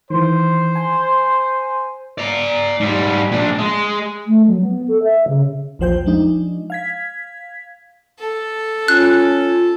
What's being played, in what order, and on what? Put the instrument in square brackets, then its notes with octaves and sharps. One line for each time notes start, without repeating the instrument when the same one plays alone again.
[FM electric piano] D#3 E3 [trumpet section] C5
[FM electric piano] G#5
[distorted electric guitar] D5 A#5
G#2 G3
A#2 D4
G#3
[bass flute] A3
F#3
B3
A4
E5
C#3
[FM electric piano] A#1 E2 F3 C5 G5 G6
F3 G#3 D4 D#4
F5 G#6 B6
[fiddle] A4
[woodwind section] C#4 [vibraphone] F4 [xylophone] F#6